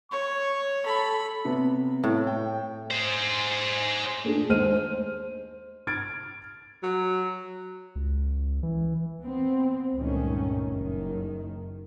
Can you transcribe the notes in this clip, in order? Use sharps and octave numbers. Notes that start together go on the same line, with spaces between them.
C#5 C#6
A4 B5
C3 B3
A2
G5
G#4 C5
A#2 A3 D4 G#4
D#2 G#3 C5 F6 D#7
C5
F6 G#6 A6 D7
F#3
C#2
E3
B3 C4
C#2 G2 A#2 D#3 A3 C#4
F#1 D#3